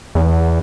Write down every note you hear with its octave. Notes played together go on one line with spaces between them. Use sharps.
E2